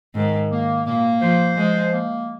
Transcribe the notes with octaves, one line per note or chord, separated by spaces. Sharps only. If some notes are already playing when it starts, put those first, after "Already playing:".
G#2 D#3
A#3
A#2 A#3
F3 C5
F3 G#3
A#3